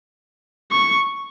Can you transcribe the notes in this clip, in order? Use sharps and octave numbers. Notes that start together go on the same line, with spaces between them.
C#6